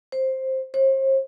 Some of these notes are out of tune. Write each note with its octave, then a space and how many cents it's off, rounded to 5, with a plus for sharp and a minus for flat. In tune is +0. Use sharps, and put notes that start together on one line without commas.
C5 +10
C5 +40